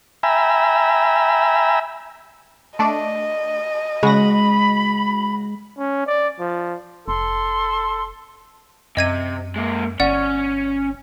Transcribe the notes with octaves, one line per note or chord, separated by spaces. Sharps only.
E5 G5 G#5 A#5 B5 E6
A3 D4 D5 D#5
C#3 G#3 F#4 B5 A#6
C#4
D5
F3
F1 A4 C6
F#2 C3 D#5 G#6 D#7
G#3 A#3
G1 C#4 D5 F#5